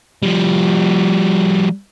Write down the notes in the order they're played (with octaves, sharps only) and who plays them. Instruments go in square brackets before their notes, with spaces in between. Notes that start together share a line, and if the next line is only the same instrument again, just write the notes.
[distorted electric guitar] F3 G3